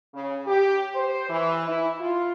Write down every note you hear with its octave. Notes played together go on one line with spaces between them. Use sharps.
C#3
G4
C5
E3
E4
F4